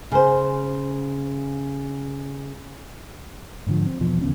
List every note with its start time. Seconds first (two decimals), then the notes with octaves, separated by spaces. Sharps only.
0.12 C#3 C5
3.67 G#2 D3 F3
3.86 C4
4.00 E2 B2 F3
4.21 D#2 C#3 B3 C#4